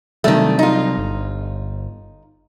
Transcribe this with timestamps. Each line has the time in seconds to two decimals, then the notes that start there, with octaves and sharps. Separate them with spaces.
0.24 C3 D#3 F#3 G3 A3
0.59 D#4 F4
0.97 G1